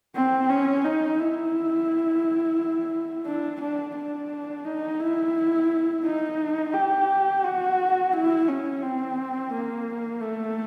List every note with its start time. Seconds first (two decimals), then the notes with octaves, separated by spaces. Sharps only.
0.15 C4
0.50 C#4
0.84 D#4
1.19 E4
3.26 D4
3.61 D4
3.96 D4
4.65 D#4
5.00 E4
6.04 D#4
6.73 G4
7.44 F#4
8.13 E4
8.48 C#4
8.82 C4
9.52 A#3
10.21 A3